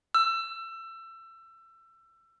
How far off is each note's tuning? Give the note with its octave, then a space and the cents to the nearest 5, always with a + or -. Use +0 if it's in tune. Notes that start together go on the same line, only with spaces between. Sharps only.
E6 +25